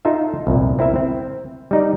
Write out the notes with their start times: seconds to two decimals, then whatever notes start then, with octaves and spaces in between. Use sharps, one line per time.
0.05 D#4 F4 A4 E5
0.47 C2 F2 A#2
0.79 C4 E4 A#4 E5
0.96 C4
1.71 G3 D#4 D5